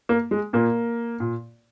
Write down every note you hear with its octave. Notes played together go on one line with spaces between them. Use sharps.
A#3
G#3
A#2 A#3
A#2